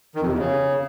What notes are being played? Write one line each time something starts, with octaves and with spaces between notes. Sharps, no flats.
D#3
F2
C3
E2
C#3